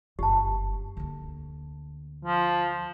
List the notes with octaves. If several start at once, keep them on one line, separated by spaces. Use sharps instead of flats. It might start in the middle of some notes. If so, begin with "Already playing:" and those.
F#1 G2 G4 A5
D2 A#3
F3